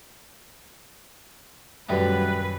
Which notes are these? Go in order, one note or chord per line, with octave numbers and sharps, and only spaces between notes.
D#1 F#2 F#3 G3 A3 B4 B6